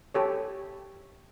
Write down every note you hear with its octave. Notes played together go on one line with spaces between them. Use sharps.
G4 A4 C#5